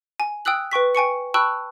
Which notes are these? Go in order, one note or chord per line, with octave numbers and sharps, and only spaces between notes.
G#5
G5 D#6 E6 F#6 F#7
B4 G5 C#6 B6
G5 G#5 C#6 C#7
G5 A5 B5 C#6 E6 F#6